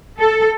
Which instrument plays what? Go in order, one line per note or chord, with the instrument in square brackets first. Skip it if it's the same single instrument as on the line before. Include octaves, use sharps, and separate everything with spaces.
[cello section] A4